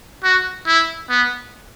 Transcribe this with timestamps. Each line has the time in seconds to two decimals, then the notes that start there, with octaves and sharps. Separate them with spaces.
0.24 F#4
0.67 E4
1.10 B3